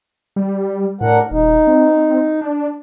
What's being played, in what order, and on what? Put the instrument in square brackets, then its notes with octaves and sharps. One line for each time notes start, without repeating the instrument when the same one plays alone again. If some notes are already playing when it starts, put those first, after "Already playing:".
[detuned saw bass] G3
[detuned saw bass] A2 [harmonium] D4 A#4 F#5
[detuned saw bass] D#1 [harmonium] D#4
[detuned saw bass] C4
D4